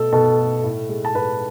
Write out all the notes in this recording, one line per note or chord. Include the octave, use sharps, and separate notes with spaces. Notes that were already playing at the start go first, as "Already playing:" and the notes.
Already playing: B2 A3 A4 A5
B2 A4 A5
A3
A2
G#3
A5
A2 B4 B5